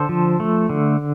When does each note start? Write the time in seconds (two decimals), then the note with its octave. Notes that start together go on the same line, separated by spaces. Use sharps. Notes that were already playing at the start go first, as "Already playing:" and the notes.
Already playing: D3 A4 C5
0.09 F3
0.40 A3
0.69 D3